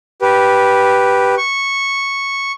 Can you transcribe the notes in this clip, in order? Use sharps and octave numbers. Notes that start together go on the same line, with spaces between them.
G4 B4
C#6